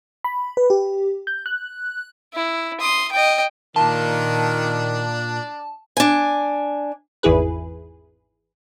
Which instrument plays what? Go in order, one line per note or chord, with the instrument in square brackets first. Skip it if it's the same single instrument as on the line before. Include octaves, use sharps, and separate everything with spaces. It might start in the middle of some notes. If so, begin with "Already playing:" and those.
[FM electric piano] B5
B4
G4
G6
F#6
[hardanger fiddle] E4
C6 D#6
D#5 G5
[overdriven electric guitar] A#2 F4 [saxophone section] D#3 [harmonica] D4 D5 [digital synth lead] A5
[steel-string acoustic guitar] D4 G#5
[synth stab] G#1 E2 E4 G#4 B4